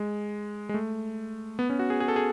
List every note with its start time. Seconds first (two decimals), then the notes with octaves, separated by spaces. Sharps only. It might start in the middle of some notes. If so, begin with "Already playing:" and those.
Already playing: G#3
0.69 G#3
0.74 A3
1.59 B3
1.70 C#4
1.79 F#4
1.90 G#4
2.00 G#4
2.08 A4
2.16 G#4